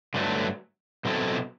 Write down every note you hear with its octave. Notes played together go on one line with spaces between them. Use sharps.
G2 D3 F#3 A3
B2 F#3 C4 E4 A4